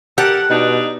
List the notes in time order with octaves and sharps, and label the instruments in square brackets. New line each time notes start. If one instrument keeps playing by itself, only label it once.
[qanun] G4 [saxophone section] A4 A#4 [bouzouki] F#5
[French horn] B2 [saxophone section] G3 D4 D#4